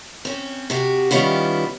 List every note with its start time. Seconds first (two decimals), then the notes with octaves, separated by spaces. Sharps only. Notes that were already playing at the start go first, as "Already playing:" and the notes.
0.25 C4 C#4
0.70 C3 F#4 G4
1.11 D#3 G3 B3 C#4 E4 F4